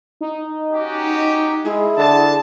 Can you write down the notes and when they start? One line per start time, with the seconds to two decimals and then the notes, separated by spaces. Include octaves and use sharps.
0.21 D#4
0.71 C#4 F#4 G4
1.65 G#3 E4 G#4
1.98 D3 A5